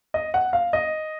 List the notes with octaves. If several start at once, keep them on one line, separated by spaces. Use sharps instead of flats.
D#5
F#5
F5
D#5